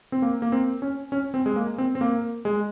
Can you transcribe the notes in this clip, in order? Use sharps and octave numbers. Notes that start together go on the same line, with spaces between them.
C4
A#3
A#3
C4
C#4
C#4
C4
G#3
A#3
C4
C4
A#3
G#3